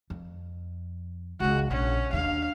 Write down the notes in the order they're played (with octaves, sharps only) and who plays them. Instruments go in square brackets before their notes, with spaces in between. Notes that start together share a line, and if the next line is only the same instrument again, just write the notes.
[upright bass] F2
[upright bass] C#2 C#4 [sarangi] F#4
[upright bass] A#1 [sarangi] C#4
[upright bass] D#2 D4 [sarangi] F5